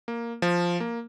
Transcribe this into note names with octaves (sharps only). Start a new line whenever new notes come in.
A#3
F3
A#3